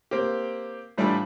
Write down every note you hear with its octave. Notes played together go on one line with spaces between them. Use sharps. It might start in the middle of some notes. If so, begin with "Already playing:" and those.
A#3 C4 G4
A2 E3 G3 D4 E4 F4